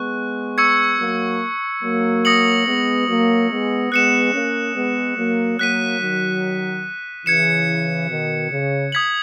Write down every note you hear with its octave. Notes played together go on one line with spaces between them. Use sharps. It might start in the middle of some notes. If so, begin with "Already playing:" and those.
Already playing: G#3 B3 C#6 F#6
C#6 E6 G#6 C#7
F#3 A#3
F#3 A#3
D#6 A#6 C#7 F#7
G#3 B3
F#3 A#3
G#3 B3
G#3 B3 F#6 C#7 E7
A#3 C#4
G#3 B3
F#3 A#3
F#3 A#3 F#6 B6 D#7
D#3 F#3
C#3 E3 G#6 C#7 E7
B2 D#3
C#3
D#6 G#6 B6 F#7